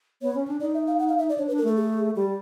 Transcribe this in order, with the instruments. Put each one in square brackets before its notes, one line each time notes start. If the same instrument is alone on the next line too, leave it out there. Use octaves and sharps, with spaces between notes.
[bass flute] B3 [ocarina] C#5
[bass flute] C#4
D4
[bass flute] D#4 [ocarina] D5
[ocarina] E5
F5
F#5
F5
E5
D5
[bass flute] D4 [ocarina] C#5
[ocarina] B4
[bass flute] D4
[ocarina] A#4
[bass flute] A3 [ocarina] A4
[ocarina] G#4
[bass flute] G3